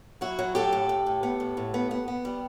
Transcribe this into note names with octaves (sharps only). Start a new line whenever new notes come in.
F#3 E4 F#4
F#3
A2 G4 A4
A2
A2
A2
B3
A2
A2
B3
B3
B3
G3